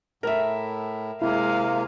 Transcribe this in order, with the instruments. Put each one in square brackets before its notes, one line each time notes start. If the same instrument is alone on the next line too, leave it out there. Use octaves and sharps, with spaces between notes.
[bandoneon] A2 [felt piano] A#4 E5
[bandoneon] C3 A#3 [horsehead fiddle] G#3 F5 [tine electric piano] E4